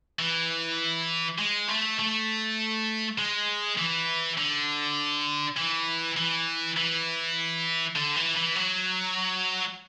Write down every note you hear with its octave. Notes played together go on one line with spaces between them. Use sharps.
E3
G#3
A3
A3
G#3
E3
D3
E3
E3
E3
D3
E3
E3
F#3